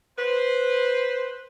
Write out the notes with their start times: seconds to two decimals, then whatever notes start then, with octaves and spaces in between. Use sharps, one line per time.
0.19 B4 C5